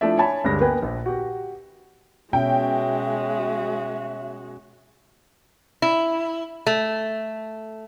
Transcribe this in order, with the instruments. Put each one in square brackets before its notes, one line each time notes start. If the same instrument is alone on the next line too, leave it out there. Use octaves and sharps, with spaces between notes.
[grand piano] F3 A3 D4 E4 D5 E5
C#5 G#5 A5 B5
D2 G2 G3 G#3 A#6
A#3 B3 B4 G5 G#5
A#1
F#4 G4
[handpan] B2 C#4 [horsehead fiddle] G#3 F#4 [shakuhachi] E5 [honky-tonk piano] G5
[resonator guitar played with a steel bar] E4
A3